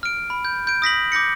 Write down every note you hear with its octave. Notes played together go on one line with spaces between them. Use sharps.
F6 D7
B5
G6
G6 D7
D#6 A#6 B6 F#7
D6 G6 A#6 C#7